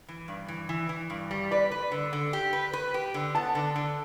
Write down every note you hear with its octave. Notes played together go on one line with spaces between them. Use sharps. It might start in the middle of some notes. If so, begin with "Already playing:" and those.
E3
G2
E3
E3
E3
G2
G3
B4 D5
B4
D3
D3
G4
B4
B4
G4
D3
B3 A5
D3
D3